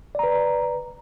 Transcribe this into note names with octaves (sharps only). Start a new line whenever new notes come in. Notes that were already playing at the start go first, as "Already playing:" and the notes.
B4 D5 A#5